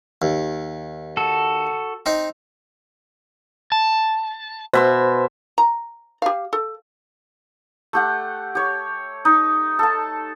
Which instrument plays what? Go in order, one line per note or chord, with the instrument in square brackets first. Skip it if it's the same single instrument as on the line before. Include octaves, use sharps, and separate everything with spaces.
[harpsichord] D#2
[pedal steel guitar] F#4 A4
[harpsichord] C4 D#4
[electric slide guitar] A5
[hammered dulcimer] B2 E5 C6 [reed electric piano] C5
[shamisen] A#5
G4 F5
A4
[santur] A3 G4 F#5
G4 C#5
D#4
A4 A5